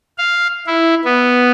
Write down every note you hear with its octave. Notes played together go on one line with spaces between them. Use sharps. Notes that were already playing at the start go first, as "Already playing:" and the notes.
F5
E4
B3